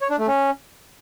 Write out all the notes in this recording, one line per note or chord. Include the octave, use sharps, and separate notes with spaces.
C#5
D4
A3
C#4